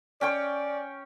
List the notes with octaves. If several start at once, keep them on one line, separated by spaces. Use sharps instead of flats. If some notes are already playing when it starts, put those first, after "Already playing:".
C#4 D5 G5 C#6